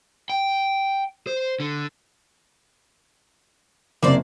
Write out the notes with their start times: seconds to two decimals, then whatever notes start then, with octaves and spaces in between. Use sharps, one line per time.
0.30 G5
1.27 C5
1.60 D3
4.03 F#1 C3 A#3 C5 D5